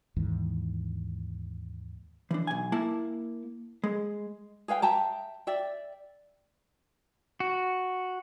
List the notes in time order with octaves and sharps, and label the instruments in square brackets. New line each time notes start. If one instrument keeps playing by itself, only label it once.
[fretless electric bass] D#2 G#2 E3
[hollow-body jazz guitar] E3 D4
B1 G#5
A#3 E4 A5
G#3
[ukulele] G#4 B4 F5 G5
E5 G5 A5 A#5
D5 E5 G5
[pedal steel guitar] F#4